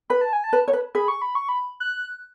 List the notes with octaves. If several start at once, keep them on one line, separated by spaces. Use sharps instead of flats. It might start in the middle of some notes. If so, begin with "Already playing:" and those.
B4 B5
A5
G#5
A5
B4
C#5
B4
G#4 B5
C#6
B5
C#6
B5
F#6